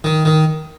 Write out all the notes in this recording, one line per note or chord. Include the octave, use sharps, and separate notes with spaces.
D#3
D#3